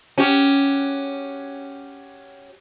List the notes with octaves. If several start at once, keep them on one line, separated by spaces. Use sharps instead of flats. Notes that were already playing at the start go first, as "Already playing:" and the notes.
C#4 F#4 G4